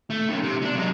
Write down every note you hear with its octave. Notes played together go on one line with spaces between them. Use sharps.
A3
F#2 D#3
C3
D4 D#4
F#3 G#3